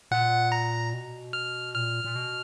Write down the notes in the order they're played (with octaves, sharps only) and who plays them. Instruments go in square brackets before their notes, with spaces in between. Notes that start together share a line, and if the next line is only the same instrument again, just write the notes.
[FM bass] A#2 [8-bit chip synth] F#5
[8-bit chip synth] A#5
[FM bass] B2
[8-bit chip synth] F6
[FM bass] A#2 [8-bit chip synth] F6
[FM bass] A#2
B2